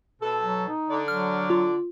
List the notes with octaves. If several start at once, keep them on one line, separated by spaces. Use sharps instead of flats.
B2 A4
F#3
D#4
D3 D5
F#3 F6
F4